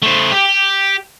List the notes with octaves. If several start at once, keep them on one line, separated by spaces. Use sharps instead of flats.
A3 C5
G4